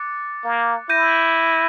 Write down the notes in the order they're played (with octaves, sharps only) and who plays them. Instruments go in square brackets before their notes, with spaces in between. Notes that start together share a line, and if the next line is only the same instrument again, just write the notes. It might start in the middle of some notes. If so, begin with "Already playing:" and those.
Already playing: [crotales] D6 F#6 A6 C#7
[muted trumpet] A#3
[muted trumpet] E4 [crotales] G6 A#6 D#7